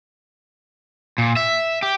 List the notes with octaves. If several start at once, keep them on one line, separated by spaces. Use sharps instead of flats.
A#2
E5
G4